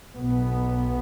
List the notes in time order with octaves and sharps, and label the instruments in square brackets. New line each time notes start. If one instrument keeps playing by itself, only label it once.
[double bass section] B1 B2 B3